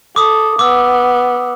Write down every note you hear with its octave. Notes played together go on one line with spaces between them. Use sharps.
A4 D6 D#6
B3 D6 E6